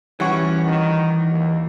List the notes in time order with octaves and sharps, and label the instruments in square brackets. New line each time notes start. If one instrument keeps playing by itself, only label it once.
[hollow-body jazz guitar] E3 F#4 [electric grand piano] G3 F#5 C#6 [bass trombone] C#4
[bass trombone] D#3
D#2